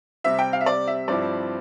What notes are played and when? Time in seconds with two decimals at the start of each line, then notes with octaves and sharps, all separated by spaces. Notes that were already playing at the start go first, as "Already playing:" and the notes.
0.24 C3 G3 C4 G4 E5
0.39 G5
0.53 F5
0.61 E5
0.66 D5
0.87 E5
1.08 G2 F3 C4 E4 G4 D5